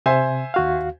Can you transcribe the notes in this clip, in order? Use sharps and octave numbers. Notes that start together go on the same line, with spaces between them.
C3 C5 E5 G#5
D#2 F#4 F5